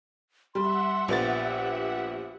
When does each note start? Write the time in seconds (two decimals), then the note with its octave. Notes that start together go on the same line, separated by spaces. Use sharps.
0.55 G3 E5 F#5 C6
1.08 A#1 B3 G4 A6